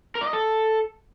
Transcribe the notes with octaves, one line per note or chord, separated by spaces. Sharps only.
A#4
D5
D#5
A4